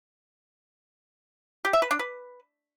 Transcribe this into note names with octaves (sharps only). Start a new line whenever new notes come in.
G4
E5
B4
D4
B4